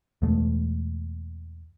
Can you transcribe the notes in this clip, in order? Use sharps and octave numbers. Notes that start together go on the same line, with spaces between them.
E2 B2 G#3 A3